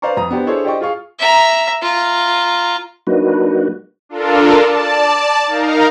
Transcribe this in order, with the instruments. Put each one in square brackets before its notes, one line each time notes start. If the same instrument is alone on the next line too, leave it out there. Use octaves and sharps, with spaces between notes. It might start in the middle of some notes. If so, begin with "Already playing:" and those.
[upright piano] B4 C5 D5 F5 A#5 C#6
F2 A#5 D#6
B3 D4 G4 C5
D4 E4 G#4 A4 C5 C#5
G4 C5 D5 D#5 G5 C#6
F4 G#4 F5 C#6
[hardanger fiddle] E5 A#5
F4 A#5
[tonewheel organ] F#3 A#3 D4 D#4 F#4 B4
[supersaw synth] D4 F4 A4 A#4
D5 A5
D#4 A#4 F5 A#5